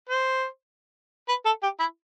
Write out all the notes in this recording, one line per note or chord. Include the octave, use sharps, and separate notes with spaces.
C5
B4
A4
G4
E4